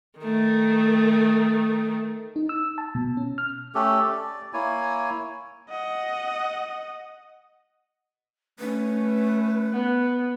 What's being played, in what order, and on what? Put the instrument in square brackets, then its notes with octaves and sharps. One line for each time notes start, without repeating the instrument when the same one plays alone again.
[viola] D#3 A3
[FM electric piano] D#4
E6
A5
B2
C#4
F6
[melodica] A3 C#4 G4 A4
D5
A#3 E4 C#5 G#5
[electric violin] D#5 F#5
[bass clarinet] A3 [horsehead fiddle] C#4 [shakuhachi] B4
[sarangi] B3